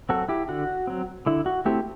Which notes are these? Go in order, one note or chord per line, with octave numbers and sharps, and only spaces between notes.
F#3 C4 F#4 A4
E4 G4
D3 F#4
F#3 C4
D3 E4
F#4
A3 C4 E4 G4